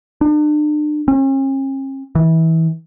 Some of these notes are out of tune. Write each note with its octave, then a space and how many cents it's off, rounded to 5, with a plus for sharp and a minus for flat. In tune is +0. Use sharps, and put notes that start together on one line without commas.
D4 +40
C#4 -45
E3 -25